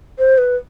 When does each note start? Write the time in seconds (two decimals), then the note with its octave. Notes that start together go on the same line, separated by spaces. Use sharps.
0.18 C5
0.38 B4